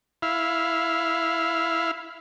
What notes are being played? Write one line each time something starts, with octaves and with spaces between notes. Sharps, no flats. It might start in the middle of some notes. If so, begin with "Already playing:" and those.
E4 F5